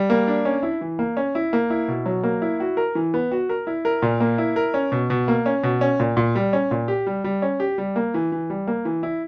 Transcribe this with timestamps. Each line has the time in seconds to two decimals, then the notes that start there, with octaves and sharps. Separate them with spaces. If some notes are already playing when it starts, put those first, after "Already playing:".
Already playing: G3
0.10 A#3
0.27 D4
0.45 C#4
0.63 E4
0.81 E3
0.99 A#3
1.17 C#4
1.35 E4
1.53 A#3
1.70 E4
1.88 B2
2.06 F#3
2.23 A#3
2.42 E4
2.60 F#4
2.77 A#4
2.95 E3
3.14 B3
3.32 F#4
3.49 A#4
3.67 E4
3.85 A#4
4.02 A#2
4.20 A#3
4.38 E4
4.56 A#4
4.74 C#4
4.92 B2
5.10 B2
5.28 A#3
5.46 C#4
5.63 B2
5.81 C#4
6.00 A#2
6.17 A#2
6.35 G3
6.53 C#4
6.71 A#2
6.88 G4
7.07 G3
7.24 G3
7.42 C#4
7.60 G4
7.78 G3
7.96 A#3
8.14 E3
8.32 E3
8.50 G3
8.67 A#3
8.85 E3
9.03 E4